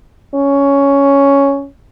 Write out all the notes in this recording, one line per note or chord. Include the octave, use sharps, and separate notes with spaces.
C#4